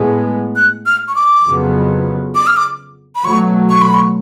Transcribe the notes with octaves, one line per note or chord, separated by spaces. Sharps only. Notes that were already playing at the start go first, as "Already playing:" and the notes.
Already playing: A2 G#3 B3
F#6
F6
C#6
D6
F2 C#3 F#3 B3
D6
F6
D6
B5
B2 F#3 A3 C#6
C#6
B5
C#6